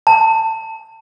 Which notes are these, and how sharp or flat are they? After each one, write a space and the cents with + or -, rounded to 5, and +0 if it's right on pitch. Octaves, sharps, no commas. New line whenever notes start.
A5 +25